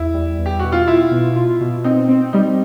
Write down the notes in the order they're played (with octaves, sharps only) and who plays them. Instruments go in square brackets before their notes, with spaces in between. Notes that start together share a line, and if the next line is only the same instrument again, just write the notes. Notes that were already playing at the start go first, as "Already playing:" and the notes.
Already playing: [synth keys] E2 [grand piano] E4
[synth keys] G3
E2
[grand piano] G4
[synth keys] B2 [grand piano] F#4
[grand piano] F4
[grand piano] E4 [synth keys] F4
[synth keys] B2
F4
B2
[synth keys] C4 [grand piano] D#4
[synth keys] C4
[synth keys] G3 [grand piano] D#4